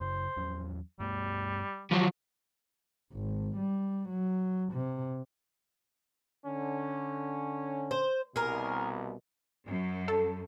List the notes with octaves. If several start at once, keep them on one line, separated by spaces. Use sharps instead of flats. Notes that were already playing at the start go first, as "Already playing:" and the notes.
F#2 C#3 C5
E2 F#3 C#4
G2 G3 A3 B3
D#3 F3 F#3 G4
G#1
G3
F#3
C3
D3 C#4
C5
C2 B2 G#4 A#4
F#2
A4